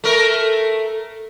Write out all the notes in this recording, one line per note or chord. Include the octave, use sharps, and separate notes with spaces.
A3 A#4